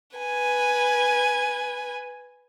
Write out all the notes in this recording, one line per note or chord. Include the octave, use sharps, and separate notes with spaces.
B4 G#5